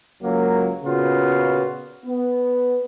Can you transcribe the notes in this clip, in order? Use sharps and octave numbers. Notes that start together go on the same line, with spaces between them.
C#2 F#3 A#3
A#2 C#3 B3 F4 F#4
B3